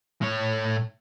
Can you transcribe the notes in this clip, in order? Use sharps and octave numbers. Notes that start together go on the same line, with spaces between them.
A2 C#5